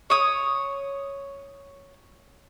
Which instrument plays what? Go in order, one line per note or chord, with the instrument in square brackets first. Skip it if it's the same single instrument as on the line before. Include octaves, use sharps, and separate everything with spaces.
[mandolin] C#5 D#6